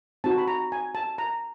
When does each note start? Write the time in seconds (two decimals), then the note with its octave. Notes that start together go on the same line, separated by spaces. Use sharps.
0.24 C4 D#4 F#4 A5
0.38 B5
0.47 A#5
0.72 G#5
0.95 A5
1.18 A#5